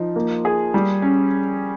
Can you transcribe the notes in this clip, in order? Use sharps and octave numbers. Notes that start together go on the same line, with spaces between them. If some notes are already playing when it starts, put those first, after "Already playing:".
Already playing: F3 D#4
A#3
G#4
G3
C#4